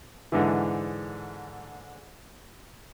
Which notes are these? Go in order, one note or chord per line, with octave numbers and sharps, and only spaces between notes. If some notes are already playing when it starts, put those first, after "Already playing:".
G#2 D3 E3